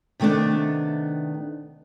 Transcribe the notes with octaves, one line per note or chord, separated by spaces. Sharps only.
C3 D#3 A3 B3 D4